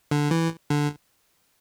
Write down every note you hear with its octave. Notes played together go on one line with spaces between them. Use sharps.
D3
E3
D3